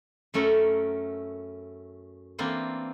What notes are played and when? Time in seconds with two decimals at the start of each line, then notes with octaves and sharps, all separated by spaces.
0.34 F#2 A3 C#4 A4 A#4 F#5
2.39 E3 A#3 C4 D4 F4